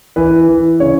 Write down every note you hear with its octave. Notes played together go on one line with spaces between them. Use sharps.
E3 B4
E3
C#3 C#5